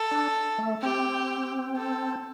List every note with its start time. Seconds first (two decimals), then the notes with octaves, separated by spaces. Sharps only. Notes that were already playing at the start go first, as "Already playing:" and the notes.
Already playing: A4
0.11 D4
0.58 A3
0.82 C4 G4
1.77 A4